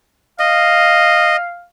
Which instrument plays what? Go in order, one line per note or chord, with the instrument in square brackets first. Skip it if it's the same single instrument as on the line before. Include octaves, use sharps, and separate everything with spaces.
[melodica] D#5 [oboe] F5